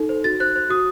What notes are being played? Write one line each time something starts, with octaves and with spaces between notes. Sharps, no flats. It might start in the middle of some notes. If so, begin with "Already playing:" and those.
Already playing: D#4 A4
C5
F#4 A6
C5 F#6
C5
F#4 D#6